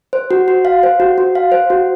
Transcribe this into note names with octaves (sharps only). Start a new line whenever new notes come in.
C5
F#4
F#4
F5
C5
F#4
F#4
F5
C5
F#4